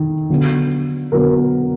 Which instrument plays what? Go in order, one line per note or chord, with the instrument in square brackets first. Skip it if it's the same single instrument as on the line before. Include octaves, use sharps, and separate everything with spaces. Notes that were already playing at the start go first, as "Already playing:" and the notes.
Already playing: [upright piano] D#3
D3 F#3 B3
D3 F#3 B3 A#4